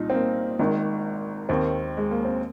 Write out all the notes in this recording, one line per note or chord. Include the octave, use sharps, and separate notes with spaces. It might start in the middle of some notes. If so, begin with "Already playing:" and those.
Already playing: C2 A#2 D#4
C4
A#3
G#1 G#2 D#3
D#2 D#3 C4
G#3
A#3
C4